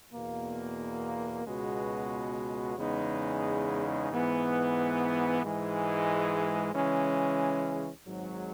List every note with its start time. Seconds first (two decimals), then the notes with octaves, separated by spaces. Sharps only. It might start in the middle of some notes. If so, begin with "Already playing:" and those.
0.13 E2 B2 A#3
1.45 C#2 B2 G#3 B3 F#4
2.77 E2 C#3 G#3 B3 D#4
4.09 G#2 E3 B3
5.42 G#2 E3 G#3
6.74 C#3 E3 G#3 C#4
8.06 G#1 G#2 F#3